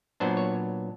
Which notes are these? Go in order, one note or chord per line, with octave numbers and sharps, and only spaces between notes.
A#2 F#3 B3 D4 C5
C#5